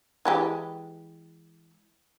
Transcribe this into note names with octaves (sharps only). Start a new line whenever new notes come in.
E3 G#3 G4